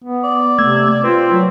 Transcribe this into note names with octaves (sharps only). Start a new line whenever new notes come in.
B3
D5
C3 A3 E6 G#6
C4 F4 B4
F#3